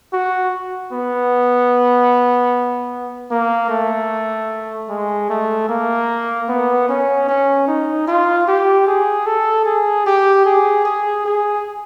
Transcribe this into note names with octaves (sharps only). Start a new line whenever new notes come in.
F#4
B3
A#3
A3
G#3
A3
A#3
B3
C#4
C#4
D#4
F4
G4
G#4
A4
G#4
G4
G#4
G#4
G#4